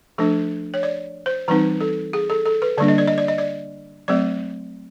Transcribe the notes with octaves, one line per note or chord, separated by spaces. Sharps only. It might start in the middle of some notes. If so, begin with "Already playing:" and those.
F3 A3 D4 A4
C#5
D5
C5
E3 G3 C4 D#4 B4
A4
G#4
A4
A4
B4
D3 G3 A#3 D4 D5
D#5
D5
D#5
D5
D#5
D5
F#3 A3 C4 D5